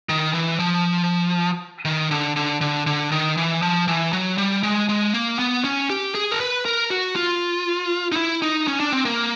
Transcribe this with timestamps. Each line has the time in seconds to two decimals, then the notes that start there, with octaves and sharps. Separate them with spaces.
0.09 D#3
0.34 E3
0.59 F3
1.85 D#3
2.11 D3
2.36 D3
2.61 D3
2.87 D3
3.12 D#3
3.37 E3
3.62 F3
3.88 E3
4.13 F#3
4.38 G3
4.63 G#3
4.89 G#3
5.14 A#3
5.39 B3
5.64 C#4
5.90 G4
6.15 G#4
6.31 A#4
6.40 B4
6.65 A#4
6.90 F#4
7.16 F4
8.12 D#4
8.16 E4
8.42 D#4
8.68 C#4
8.80 D4
8.92 C4
9.05 A#3